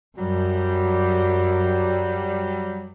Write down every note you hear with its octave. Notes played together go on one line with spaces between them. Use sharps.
F#2 F#3 G3